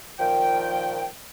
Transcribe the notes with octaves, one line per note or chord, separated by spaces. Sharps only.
A#2 D#3 F3 G5